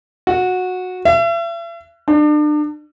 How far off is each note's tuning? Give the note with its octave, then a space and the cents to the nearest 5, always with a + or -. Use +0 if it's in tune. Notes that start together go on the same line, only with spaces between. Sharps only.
F#4 -15
E5 +40
D4 +35